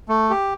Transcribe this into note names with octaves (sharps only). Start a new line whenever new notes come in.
A3
G4